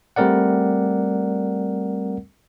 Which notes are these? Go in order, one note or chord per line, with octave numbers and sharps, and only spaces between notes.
G3 A3 C4 A#4 D5 F#5